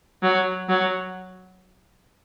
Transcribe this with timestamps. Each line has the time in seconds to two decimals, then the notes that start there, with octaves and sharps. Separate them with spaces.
0.23 F#3
0.69 F#3